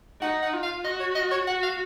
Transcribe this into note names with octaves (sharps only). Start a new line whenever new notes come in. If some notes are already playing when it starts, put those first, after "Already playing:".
D#4 F#5
F#5
F4
F5
F#4 D#5
C#5
D#5
C#5
F#4 F#5
F5